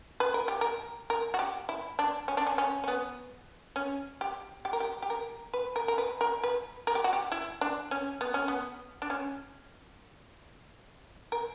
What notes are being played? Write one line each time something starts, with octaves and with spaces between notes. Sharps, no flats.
B4
A#4
G4
A#4
A#4
F#4
G4
E4
D4
C#4
D4
C#4
C#4
C#4
B3
C#4
G4
G4
A#4
G4
G4
A#4
B4
A#4
A#4
B4
A#4
B4
A#4
G4
F#4
G4
E4
D4
C#4
B3
C#4
B3
D4
C#4
A#4